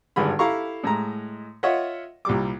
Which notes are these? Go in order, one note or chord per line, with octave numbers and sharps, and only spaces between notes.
G#1 G2 D3 G#4 B5
E4 G4 A4 F5 A#5 C#6
A2 G#3 A#5
F4 C#5 D#5 E5 F#5
C2 A#2 G3 D6